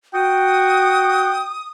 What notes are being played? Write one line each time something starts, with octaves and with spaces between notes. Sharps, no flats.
F#4 G5 D#6